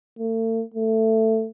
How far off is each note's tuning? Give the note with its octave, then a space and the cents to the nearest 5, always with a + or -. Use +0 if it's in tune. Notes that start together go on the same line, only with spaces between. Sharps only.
A3 +40
A3 +15